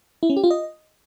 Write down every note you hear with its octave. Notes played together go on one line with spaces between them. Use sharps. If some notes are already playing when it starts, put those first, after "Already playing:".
E4
C#4
G4
F4
D#5